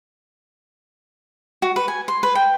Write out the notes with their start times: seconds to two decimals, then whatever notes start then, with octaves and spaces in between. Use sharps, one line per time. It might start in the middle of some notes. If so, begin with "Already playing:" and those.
1.62 F#4
1.76 B4
1.88 G#5
2.08 C6
2.23 B4
2.35 G5